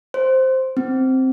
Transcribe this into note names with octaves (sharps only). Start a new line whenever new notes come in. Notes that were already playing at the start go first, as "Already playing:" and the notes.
C5
C4